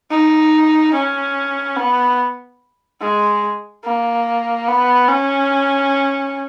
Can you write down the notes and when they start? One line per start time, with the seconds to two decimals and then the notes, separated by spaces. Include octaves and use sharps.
0.11 D#4
0.94 C#4
1.77 B3
3.01 G#3
3.84 A#3
4.68 B3
5.09 C#4